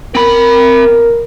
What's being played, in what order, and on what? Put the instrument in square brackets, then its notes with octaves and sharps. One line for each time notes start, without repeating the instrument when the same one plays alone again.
[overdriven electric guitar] C4 B5 [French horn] A#4